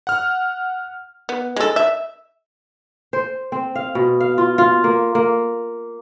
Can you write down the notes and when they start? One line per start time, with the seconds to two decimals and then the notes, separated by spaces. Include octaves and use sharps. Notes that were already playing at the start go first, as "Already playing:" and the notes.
0.07 F#5 F6
1.29 B3
1.56 G#3 A4
1.76 E5
3.13 C5
3.52 C4
3.75 F5
3.95 B2
4.20 F5
4.38 F4
4.58 F4
4.84 A#3
5.15 A#3